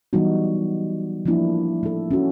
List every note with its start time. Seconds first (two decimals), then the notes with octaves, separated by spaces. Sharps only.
0.13 E3 F#3 G3 B3 D#4 F#4
1.26 F3 A3 A#3 D4 E4
1.83 A3 A4
2.11 C#4 F#4